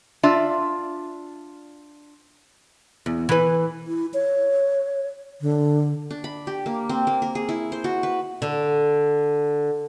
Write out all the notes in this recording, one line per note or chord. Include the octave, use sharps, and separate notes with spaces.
D4 F4 D5 E5
E2
E3 B4
E4
C#5
D3
D4
B5
G4
A#3
C4
A#3
A#4
G#4
E4
C5
F#4
B4
D3